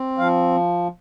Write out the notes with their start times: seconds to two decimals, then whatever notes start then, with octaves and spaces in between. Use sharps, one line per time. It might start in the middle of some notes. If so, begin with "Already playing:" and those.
Already playing: C4
0.18 F3 F5